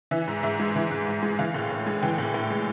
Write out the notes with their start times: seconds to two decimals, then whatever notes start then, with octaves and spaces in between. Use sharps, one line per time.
0.11 E3 E5
0.28 G#2
0.43 G#2 E5
0.60 G#3
0.76 E3
0.91 G#2
1.07 G#2
1.23 G#3
1.39 E3 F5
1.54 A2
1.70 A2
1.86 G#3
2.02 E3 G5
2.18 A2
2.34 A2 G5
2.50 G#3